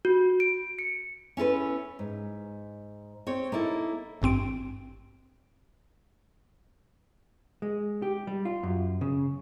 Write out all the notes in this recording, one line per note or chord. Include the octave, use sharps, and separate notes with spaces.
F#4
D7
C#7
C#4 E4 A4 B4
G#2
C4 C#5
A#3 D#4 E4 A4
G#1 G2 C4 D7
G#3
G4
G3
F4
F#2
C#3